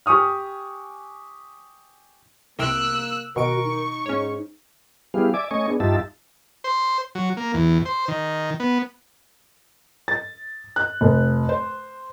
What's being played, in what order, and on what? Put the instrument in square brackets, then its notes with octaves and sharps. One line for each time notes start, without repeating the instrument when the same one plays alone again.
[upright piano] G4 G#5 C#6 D#6 F6
[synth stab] C2 C3 D7 [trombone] A#3 [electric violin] E6 F#6
[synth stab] B2 D#3 D7 [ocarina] F#4 [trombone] A#4 [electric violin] C#6
[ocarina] D#4
[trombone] G#2 [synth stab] C#4 C#5
[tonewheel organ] G3 B3 E4 G4 G#4 F5
D5 E5 G#5 D6
A3 C#4 D#5 G#5 C#6
B3 D4 G#4
G2 D#4 F4 G4 E5 A5
[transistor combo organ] C5
F#3
A#3
E2
C5
D#3
B3
[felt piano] A6
F#6
F1
C5